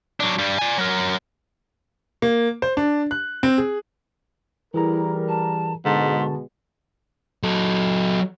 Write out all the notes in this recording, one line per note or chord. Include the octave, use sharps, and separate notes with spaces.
F#3 D4
G2 G3
D5 G#5
F#3 A#4
A#3
C5
D4
F#6
C4
G#4
E3 G3 E4 G#4 A#4 A#5
A5
G#2 B2 D3 G#3 F#4 A5 C6
F#3 A4